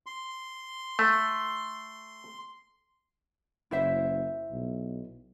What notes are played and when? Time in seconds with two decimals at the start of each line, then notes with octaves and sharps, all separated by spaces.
0.06 C6
0.99 A3
3.71 F#1 E4 C5 E5
4.51 B1